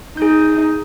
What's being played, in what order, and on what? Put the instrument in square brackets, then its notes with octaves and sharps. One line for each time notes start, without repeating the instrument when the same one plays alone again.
[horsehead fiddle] D#4 [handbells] G#4 G6